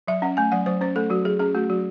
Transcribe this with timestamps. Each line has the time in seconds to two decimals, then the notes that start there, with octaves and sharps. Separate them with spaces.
0.08 F#3 E5
0.22 C#4 F#5
0.37 A3 G#5
0.52 F#3 F#5
0.66 F#3 C5
0.81 C#4 C5
0.96 A3 A4
1.10 F#3 F#4
1.25 F#3 G#4
1.40 C#4 G#4
1.54 A3 F#4
1.70 F#3 F#4